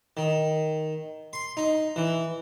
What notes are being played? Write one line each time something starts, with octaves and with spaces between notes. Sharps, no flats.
D#3
C6
D#4
E3